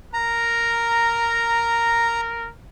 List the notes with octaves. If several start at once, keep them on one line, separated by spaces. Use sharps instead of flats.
A#4 A#5